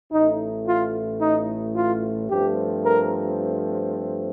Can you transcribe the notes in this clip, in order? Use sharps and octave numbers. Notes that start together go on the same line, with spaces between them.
A1 A2 A3 D#4
F4
D#4
F4
G2 F3 A3 C4 G4
A#4